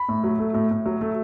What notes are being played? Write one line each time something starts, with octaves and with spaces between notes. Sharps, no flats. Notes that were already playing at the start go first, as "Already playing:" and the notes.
Already playing: B5
A2
F#3
A3
A2
A2
F#3
A3